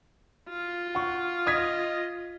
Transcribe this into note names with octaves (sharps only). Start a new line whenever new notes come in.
F4
F#5 C#6
D#5 D#6 G#6 B6